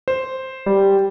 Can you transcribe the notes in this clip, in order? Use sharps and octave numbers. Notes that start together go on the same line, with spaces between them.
C5
G3